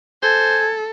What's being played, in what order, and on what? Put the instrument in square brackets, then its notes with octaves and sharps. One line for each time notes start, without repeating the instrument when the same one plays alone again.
[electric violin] A4 [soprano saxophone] C5 [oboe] G#5